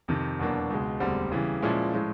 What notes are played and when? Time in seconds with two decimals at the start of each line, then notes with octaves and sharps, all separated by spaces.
0.08 F2 C3 D#3
0.39 E2 B2 F#3 A#3 D4
0.70 C#2 B2 G#3
1.00 E1 D2 D3 G3 C4
1.32 C#3 E3 G3
1.62 A#2 F3 G#3 C#4 E4
1.93 A2 F3 G#3